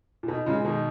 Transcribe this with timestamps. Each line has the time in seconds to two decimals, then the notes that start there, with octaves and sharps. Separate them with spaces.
0.23 A#2
0.28 B2 D#4
0.46 A#2 C#3 G#3
0.64 B2 D#3 D#4